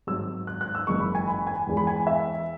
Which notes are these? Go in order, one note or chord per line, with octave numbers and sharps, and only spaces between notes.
G#1 G#2 F#3 E6
F#6
F#6
E6
F#1 F#2 E3 G#3 C#6
B5
G#5
B5
G#5
E2 E3 G#3
B5
G#5
E5